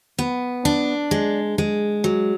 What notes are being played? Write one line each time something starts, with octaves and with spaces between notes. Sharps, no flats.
B3
D4
G#3
G#3
F#3